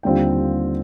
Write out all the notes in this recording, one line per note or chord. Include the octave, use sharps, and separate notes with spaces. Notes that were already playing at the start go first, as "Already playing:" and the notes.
D#2 D3 G3 C4 F4 G5